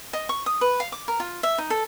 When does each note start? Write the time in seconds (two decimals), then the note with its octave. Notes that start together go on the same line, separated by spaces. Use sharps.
0.13 D#5
0.29 C#6
0.46 D#6
0.61 B4
0.80 F5
0.92 D6
1.08 A#4
1.20 F4
1.43 E5
1.58 D#4
1.70 A4